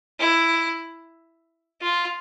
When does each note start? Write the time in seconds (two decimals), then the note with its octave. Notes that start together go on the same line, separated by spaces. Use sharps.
0.19 E4
1.81 F4